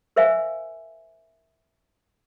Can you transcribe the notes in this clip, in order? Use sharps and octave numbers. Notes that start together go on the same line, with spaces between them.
A#4 C5 E5 F5 G#5